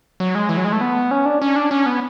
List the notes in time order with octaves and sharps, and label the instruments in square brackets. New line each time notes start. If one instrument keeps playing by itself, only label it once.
[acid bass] F#3
G#3
E3
F#3
G#3
A3
B3
C#4
D4
C#4
D4
C#4
B3